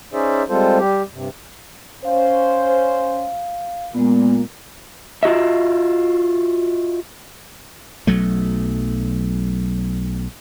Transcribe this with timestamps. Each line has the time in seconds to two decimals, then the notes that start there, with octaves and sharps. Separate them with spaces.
0.13 C#4 D#4 G#4 C5 D5 E5
0.49 G3 G#3 C4 F4 A4 C5
0.79 G3 G4
1.14 G2 C3
2.05 C#4 C5 F5
3.94 A#2 G#3 B3
5.23 F4 F#4 D#5 E5
8.07 B1 F#3 A3